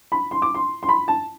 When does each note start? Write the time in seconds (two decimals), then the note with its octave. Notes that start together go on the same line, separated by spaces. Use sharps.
0.12 B5
0.31 C6
0.42 D6
0.55 C6
0.83 C6
0.89 B5
1.08 A5